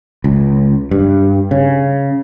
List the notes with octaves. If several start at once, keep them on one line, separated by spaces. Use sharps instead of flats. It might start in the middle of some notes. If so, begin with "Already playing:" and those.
C#2
G2
C#3